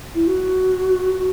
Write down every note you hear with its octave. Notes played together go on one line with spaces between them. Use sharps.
E4
F#4